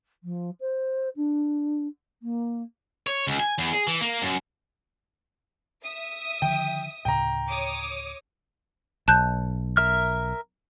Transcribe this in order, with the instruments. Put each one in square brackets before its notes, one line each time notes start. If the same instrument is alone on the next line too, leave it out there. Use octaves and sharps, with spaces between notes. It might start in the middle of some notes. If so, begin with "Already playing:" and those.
[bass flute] F3
C5
D4
A#3
[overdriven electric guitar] C#5
C#2
G#5
E2
G#4
E3
A#3
F#2
[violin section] E5 D#6
[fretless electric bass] D3 D#3 F3 [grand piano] G5
[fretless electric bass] D2 A2 C#3 [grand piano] G5 A#5
[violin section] C#5 D6 D#6
[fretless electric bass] B1 [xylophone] A5 F#6 G6
[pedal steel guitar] A#4 E5 F6